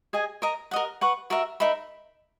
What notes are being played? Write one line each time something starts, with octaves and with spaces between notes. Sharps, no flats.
G#4 D#5 G#5
A#4 D#5 A#5
A#4 D#5 F#5
B4 F#5 C#6
F#4 A#4 E5
D#4 A#4 E5 B5